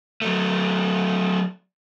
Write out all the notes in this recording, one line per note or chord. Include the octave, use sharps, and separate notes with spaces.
F#3 A3